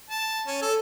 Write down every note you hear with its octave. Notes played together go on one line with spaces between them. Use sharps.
A5
C#4
A4